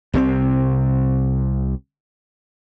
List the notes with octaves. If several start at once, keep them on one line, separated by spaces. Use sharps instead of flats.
C2 C3 F#3 C4